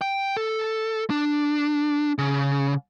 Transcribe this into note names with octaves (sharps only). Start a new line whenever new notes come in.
G5
A4
D4
C#3